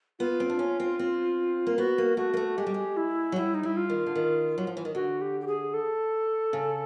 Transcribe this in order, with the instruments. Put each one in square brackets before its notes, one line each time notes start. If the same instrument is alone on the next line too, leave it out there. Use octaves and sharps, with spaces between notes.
[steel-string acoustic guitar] B3 [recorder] F4
[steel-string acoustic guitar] C4
D4
C#4
C4
C4
A#3
[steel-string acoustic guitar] B3 [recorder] F#4
[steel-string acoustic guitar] A#3
[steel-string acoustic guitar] A3 [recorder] F#4
[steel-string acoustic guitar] A#3
A3
[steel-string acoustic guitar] G#3 [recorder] G4
[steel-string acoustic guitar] G3
G#3
[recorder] E4
[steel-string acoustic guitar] F#3
[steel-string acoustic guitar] G3 [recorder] E4
[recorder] D#4
[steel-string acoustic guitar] G3 [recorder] E4
[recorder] F4
[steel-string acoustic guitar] D#3
D3
D#3
F#3
F3
E3
D#3
[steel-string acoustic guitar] D3 [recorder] F#4
[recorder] G4
G4
G#4
A4
[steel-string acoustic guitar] C#3